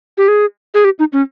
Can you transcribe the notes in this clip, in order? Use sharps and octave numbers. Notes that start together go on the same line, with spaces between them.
G4
G#4
G#4
G4
D#4
C#4